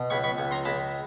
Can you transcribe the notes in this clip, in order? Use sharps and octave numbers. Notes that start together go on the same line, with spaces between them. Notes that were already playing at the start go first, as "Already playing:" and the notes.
Already playing: B2
C#2 B5 C#6
B5 C#6
C#2
A#5 C6
C#2 A5 B5